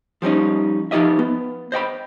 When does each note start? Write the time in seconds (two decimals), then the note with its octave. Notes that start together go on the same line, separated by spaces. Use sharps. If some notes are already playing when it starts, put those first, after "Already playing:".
0.22 F3 G3 C#4 D#4
0.91 F3 D#4 F4 G4 D#5 E5
1.19 B3
1.72 C5 D#5 G5 B5